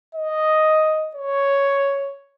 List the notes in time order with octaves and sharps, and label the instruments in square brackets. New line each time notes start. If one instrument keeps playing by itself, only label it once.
[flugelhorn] D#5
C#5